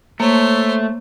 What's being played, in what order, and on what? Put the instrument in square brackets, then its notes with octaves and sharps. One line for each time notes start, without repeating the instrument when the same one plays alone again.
[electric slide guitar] A3 [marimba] A#3 [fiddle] C5 C#5